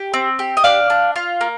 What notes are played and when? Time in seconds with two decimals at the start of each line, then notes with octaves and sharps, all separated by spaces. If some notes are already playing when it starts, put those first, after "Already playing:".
Already playing: G4
0.14 C4
0.39 G4
0.57 D#5
0.64 D4 D5 F5
0.90 D4
1.16 F4
1.41 A#3